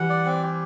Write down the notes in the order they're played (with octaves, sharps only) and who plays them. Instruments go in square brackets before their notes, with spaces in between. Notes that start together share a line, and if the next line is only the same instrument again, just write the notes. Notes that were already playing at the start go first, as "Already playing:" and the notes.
Already playing: [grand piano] E3 G3 [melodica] F#5
[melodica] D5
C4
G4